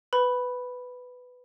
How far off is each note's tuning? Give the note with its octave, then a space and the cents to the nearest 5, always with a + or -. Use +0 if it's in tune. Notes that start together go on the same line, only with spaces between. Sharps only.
B4 +10 B5 +0